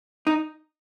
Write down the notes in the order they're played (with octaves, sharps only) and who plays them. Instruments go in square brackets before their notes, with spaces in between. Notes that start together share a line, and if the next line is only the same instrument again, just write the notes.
[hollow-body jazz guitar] D#4